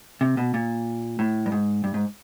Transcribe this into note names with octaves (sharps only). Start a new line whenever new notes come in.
C3
B2
A#2
A2
G2
G#2
G2
G#2